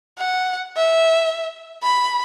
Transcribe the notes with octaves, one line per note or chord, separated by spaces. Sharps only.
F#5
E5
B5